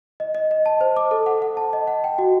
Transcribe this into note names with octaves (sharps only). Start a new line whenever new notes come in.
D#5
D#5
D#5
A5
C5
D6
A4
F#5
F#5
A5
D#5
F#5
G5
F#4